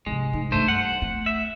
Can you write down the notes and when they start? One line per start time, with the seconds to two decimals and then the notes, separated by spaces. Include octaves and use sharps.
0.06 G#2 C3 G#3
0.33 G#2
0.52 G2 A3 A#3 C5
0.68 G3 F#5
1.02 A3
1.26 E5